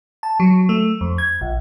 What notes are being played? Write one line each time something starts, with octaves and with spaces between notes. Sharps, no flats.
A5
F#3
A3
F2
G#6
A#1